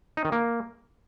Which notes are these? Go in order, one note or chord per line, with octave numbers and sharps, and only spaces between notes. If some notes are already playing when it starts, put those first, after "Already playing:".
D#4
D#3
A#3